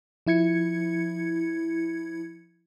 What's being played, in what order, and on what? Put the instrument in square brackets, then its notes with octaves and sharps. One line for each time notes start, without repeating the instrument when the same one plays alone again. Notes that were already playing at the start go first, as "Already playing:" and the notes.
[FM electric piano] F3 E4 G#6 C#7